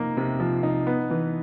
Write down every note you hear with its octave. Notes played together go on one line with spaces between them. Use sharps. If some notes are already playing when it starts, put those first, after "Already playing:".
Already playing: C3 F3 A#3 D#4
C3
F3
D#4
B3
E3